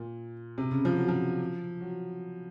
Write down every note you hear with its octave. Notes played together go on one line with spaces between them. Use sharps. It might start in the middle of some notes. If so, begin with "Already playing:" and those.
Already playing: A#2
C3
C#3
F3
F#3
F3
F#3